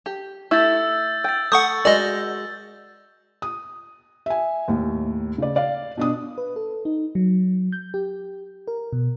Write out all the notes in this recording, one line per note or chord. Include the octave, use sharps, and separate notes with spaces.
G4
A3 E4 E6 G6 A6
G5 G6 A6
A3 F#5 C#6 D#6 G6
G#3 F#4 A#4 D5 D#5
D#6
E5 G#5
D#2 A2
C#3 D5
D5 F5
B2 D4 D#6
B4
A4
D#4
F#3
G6
G4
A#4
B2